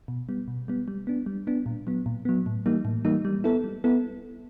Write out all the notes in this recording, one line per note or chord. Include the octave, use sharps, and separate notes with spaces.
B2
G3 B3
B2
G3 B3
G3
B3 D4
G3
B3 D4
A#2
F#3 B3
A#2
F#3 B3
A2
E3 G3 A#3 D#4
A2
E3 G3 A#3 D#4
G3
B3 E4 A4
G3
B3 E4 A4